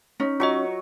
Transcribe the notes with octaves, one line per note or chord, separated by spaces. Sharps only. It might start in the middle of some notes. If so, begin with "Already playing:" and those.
C#4 D#4
F#3 F4 D#5 C#6